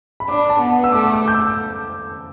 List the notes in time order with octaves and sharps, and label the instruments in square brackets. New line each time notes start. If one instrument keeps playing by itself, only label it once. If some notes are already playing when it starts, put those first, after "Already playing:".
[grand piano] B5
[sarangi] D4 [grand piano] D6
[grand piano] A5
[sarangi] B3
[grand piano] E6
[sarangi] A3 [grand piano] D6
[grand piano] D6
G6
E6